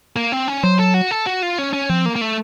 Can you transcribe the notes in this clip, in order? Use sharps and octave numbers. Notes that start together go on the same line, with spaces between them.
A#3
C4
C#4
F#3 C5
A4
F#4
A4
F#4
F4
C#4
C#4
F3 C4
A#3
A#3
A3